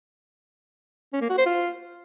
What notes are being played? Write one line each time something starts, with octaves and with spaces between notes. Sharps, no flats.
C#4
A#3
F#4
C5
F4